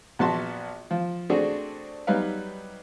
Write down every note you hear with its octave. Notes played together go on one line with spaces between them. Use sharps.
A#1 B3 F#4 A5 C6
F3
A3 C4 D4 F#4 G#4
F#3 G3 D#4 B4 F5